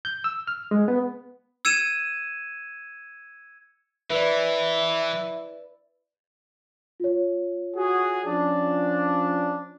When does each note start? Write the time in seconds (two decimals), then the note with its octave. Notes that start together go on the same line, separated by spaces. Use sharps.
0.05 G6
0.24 E6
0.47 F6
0.71 G#3
0.88 B3
1.65 E6 G#6 C#7 D#7 E7
4.10 E3 E4 B4 D5
7.00 F4 C#5
7.76 F#4 G#4
8.25 F3 C#4 D4